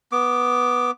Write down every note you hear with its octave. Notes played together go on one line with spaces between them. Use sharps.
B3 D6